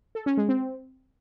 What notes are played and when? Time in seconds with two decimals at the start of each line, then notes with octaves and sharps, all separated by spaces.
0.15 A4
0.26 C#4
0.37 G#3
0.49 C4